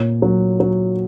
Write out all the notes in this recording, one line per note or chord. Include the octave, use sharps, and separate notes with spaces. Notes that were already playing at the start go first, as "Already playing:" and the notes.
Already playing: A#2 C#5
F#3
F#3